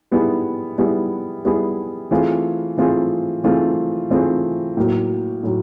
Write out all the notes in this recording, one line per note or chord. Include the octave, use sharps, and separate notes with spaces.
G3 B3 E4 G#4
G3 B3 E4 G#4
G3 B3 E4 G#4
E3 A3 C4 F4 G#4
E3 A3 C4 F4 G#4
E3 A3 C4 F4 G#4
E3 A3 C4 F4 G#4
A2 F#3 A#3
A2 F#3